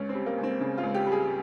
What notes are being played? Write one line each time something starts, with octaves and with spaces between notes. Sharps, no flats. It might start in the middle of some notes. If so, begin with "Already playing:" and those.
Already playing: C#2 C#4
C4
G3
A#3
C#2
C4
C#3
F4
C#2
G4
G3
G#4